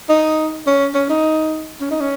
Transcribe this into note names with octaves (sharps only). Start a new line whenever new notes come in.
D#4
C#4
C#4
D#4
C#4
D#4
C#4